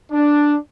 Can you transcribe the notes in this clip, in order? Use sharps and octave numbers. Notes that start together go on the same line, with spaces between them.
D4